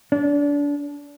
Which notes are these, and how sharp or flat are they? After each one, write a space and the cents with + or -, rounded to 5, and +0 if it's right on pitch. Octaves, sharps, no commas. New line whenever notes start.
D4 -30